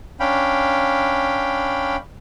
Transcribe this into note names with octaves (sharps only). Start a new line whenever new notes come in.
C#4 D4 F5 G5 B5